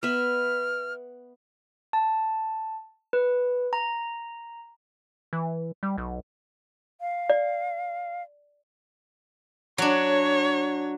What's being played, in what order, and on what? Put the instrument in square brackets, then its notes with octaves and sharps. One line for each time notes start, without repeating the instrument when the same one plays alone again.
[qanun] B3 E5 [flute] F6
[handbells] A5
B4
A#5
[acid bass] E3
G3
B1
[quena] F5
[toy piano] D5
[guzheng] F#3 D4 [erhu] C#5